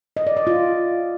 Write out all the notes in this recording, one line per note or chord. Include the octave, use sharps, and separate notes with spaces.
D#5
D5
D5
F4